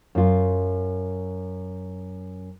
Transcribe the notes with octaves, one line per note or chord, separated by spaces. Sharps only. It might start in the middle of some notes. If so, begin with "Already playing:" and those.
F#2 F4